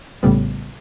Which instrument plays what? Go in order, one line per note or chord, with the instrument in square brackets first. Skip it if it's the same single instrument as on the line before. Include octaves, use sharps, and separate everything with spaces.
[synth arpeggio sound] A#1 A2 C#3 G3 B3